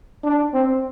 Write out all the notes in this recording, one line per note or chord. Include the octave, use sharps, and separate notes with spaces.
D4
C4